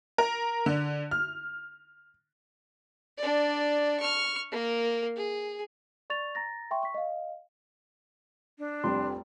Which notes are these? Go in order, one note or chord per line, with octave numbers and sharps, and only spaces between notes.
A#4
D3
F6
D4 D5
C#6 F6
A#3 A#4
G#4
D5 C#6 A6 F7
A#5 A6 A#6
E5 G5 C6 C#6
C#6 B6
D#5 F5
D4
F1 G3 C4 C6